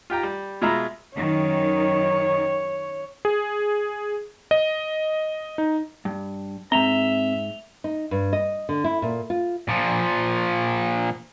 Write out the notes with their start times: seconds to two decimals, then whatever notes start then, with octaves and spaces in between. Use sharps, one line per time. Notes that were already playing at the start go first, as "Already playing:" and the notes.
0.10 F4 G4 G5 A#5
0.23 G3
0.62 B2 G#3 F4 E5 A#5 B5
1.16 F#2 D#3 C#5
3.25 G#4
4.51 D#5
5.58 D#4
6.05 G2
6.72 G#2 C4 E5 A#5 F7 G7
7.84 D#4
8.11 G2
8.33 D#5
8.69 D3
8.84 E4
9.02 A#2
9.30 F4
9.69 A#2 F3